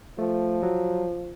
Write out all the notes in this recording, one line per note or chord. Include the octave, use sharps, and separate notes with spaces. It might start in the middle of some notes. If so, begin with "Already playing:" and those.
F3 A3
F#3